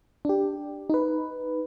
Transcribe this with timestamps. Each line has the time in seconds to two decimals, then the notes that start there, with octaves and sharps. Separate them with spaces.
0.25 D4 G4
0.90 D#4 B4